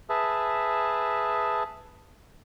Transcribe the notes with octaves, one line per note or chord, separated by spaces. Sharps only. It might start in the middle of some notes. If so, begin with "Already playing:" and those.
G#4 B4 E5 A5